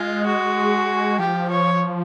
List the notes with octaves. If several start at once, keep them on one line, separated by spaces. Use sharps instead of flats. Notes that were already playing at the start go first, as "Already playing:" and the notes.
Already playing: G#3 F4
F#4
F3 G4
C#5